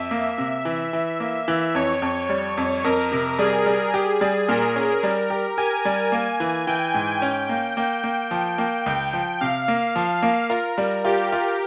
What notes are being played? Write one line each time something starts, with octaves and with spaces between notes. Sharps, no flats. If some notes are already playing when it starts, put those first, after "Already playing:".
Already playing: F2 E5
A#3
C3
E3
E3
A#3
E3
F2 C#5
F2
G3
F2
F2 A#4
C3
G3 G#4
G3
G4
G3
A#2 A#4
C#4
G3
G4
G4 G#5
G3
A#3
E3
E3 G5
G#2
C#4
A#3
A#3 G5
A#3
F3
A#3
C#2 G5
F3
C3 F5
A#3
F3
A#3
F4 A#4
G3
F4 G4
F4